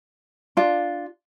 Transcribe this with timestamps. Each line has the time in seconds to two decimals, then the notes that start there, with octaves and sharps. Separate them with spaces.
0.57 D4 F4